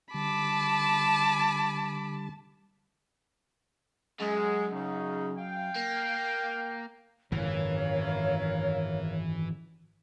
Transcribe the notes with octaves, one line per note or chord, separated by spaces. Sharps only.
D3 G3 A5 B5 D6
F#2 G#3
C#3 D#4
F5 G5
A#3
G#1 F#2 C#3 E3 A#4 C#5 F5